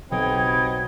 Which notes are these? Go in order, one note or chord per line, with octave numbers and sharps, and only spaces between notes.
B1 C4 D#4 G4 B4 G5 G#6